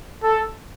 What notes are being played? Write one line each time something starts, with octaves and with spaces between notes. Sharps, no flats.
A4